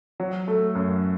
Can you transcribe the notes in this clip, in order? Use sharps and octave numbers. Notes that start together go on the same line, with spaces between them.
F#3
A3
F#2